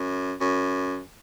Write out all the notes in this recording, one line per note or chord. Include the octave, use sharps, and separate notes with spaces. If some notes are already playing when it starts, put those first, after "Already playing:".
Already playing: F#2
F#2